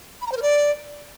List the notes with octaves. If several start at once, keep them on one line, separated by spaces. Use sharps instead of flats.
B5
A#5
C5
A#4
D5